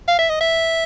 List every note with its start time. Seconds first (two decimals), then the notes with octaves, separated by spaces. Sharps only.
0.08 F5
0.19 E5
0.30 D#5
0.41 E5